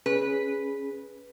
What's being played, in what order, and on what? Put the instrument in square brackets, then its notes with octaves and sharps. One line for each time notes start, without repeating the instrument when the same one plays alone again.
[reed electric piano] C#4 G#4 [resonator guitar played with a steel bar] B4